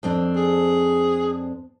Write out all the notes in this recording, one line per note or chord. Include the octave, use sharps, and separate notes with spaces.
F2 C4 D4
G#4